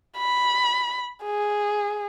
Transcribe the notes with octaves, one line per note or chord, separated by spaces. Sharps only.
B5
G#4